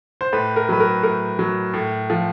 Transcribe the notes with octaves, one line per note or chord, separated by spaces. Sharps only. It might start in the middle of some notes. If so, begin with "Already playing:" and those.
C5
A2 B4
A#4
F#3 B4
A#4
A2 A#4
F#3
A2
F3